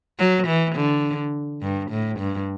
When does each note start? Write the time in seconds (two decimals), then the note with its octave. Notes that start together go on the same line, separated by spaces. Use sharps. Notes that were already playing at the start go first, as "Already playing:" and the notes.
0.19 F#3
0.47 E3
0.75 D3
1.62 G2
1.91 A2
2.19 G2